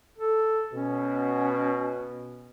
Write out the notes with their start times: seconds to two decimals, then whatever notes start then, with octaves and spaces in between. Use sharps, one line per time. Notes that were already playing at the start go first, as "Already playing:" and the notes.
0.19 A4
0.73 B2 C#4